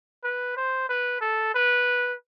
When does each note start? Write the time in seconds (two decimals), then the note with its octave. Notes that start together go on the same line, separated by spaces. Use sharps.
0.24 B4
0.57 C5
0.89 B4
1.21 A4
1.55 B4